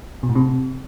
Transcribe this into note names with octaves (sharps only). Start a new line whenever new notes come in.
B2
A2
C3